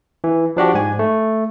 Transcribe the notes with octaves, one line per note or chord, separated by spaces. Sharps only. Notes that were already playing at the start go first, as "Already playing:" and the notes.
E3
F3 D4 F#4 G4
G#2 G#5
A3